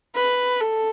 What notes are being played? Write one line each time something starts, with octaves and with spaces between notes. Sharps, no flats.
B4
A4